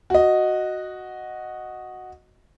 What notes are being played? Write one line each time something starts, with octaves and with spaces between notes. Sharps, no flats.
F#4 D#5